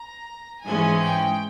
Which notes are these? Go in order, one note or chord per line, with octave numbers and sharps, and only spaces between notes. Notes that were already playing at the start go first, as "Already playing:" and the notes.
Already playing: A#5
G#2 E3 G#3 C#4 G#5
G5